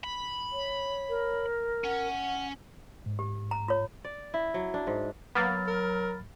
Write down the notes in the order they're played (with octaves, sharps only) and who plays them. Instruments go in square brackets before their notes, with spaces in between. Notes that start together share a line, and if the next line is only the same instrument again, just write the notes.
[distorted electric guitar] B5
[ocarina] C#5
[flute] A#4
[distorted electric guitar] C#4 [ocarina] F#5
[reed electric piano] G#2
[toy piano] G4
A#5
F4 C#5
[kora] D5
E4
F#3
D4
G#2
[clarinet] F#3 [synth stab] A#3 B3 [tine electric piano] B5 F6 A6
[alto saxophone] A#4